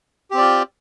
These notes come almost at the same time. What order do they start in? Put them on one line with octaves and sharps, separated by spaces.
G4 C4 D5 F4